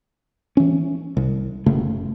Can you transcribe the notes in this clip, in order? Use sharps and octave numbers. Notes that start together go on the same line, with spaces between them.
E3 C#4
C2
F#1 C#3 A3